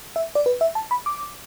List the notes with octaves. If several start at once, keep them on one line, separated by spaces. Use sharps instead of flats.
E5
D5
B4
E5
A5
B5
D6